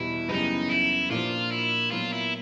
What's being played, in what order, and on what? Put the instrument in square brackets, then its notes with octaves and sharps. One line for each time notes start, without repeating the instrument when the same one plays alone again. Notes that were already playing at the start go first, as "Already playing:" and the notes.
Already playing: [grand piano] E2 B2 G3 [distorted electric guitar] E4
[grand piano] F#2 C#3 E3 G3 B3 [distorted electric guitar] D#4
[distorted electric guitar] E4
[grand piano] A#2 F3 A#3 D4 [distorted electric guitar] F4
[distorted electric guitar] E4
[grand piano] A#2 F#3 B3 [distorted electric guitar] F4
[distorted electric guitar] E4